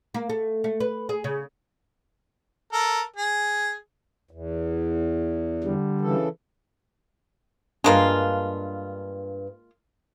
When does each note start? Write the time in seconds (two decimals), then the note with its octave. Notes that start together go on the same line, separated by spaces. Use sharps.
0.14 A#3
0.29 A3
0.64 A3
0.80 B4
1.09 G#4
1.24 C#3
2.73 A4 A#4
3.16 G#4
4.31 E2
5.64 D3 G3
6.01 C#3 E3 A4
7.84 G2 G#3 A#3 D4 F4